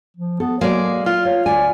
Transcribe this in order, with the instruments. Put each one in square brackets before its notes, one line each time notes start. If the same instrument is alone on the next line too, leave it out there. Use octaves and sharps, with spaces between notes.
[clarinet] F3
[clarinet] B3 [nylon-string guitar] A4
[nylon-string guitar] F#3 A#3 [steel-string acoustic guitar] G#3 D5 [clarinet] F5
[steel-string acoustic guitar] F4 [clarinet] F6
[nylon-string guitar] C#5 [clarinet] F5
[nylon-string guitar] D2 G#5 [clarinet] D5